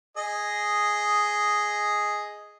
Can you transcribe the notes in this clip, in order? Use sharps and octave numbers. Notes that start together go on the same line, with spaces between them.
G#4 D#5